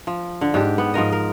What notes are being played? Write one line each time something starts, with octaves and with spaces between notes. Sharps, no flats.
F3
D3
G#2 D4 G4
B3
G#2 F3 A#4 D#5
A#4